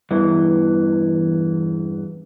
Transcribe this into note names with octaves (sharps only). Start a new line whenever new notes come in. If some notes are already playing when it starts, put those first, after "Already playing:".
E2 G2 E3